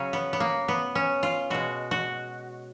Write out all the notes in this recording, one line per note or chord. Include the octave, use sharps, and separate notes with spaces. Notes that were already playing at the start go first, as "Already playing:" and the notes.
Already playing: C#3 F#3 C#4
B3
B3
A#3
B3
C#4
F4
B2 G#3 F#4
F#4